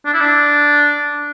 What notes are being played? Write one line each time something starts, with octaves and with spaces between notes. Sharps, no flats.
D4
E4
D4